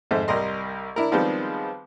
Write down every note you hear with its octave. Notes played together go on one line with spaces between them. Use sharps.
F2 G#2 C5 E5
C2 G3 A#4 D#5 C6
D4 E4 A#4
D#3 F3 G3 G#3 B3 C4